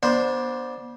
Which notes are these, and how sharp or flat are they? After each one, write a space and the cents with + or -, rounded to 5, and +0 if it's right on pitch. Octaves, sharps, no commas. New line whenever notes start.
B3 -35 D4 +0 C5 +0